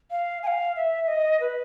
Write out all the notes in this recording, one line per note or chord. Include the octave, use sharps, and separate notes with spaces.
F5
G#5
F5
E5
D#5
B4